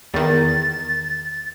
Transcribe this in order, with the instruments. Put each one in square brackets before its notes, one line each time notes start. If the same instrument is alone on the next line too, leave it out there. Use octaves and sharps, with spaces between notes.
[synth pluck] E2 D#3 [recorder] A6